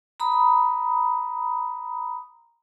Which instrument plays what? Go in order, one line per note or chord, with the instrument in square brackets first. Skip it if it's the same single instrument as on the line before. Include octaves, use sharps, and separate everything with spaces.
[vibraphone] A#5 B5 D#6